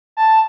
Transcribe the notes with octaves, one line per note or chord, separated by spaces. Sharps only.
A5